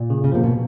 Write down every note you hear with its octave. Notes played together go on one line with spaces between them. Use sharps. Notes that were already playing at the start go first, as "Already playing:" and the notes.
Already playing: A#2
C#3
C#3
C3 F3 A#3
B2